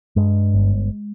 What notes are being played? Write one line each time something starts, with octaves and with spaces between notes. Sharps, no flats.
G2 G#3
G1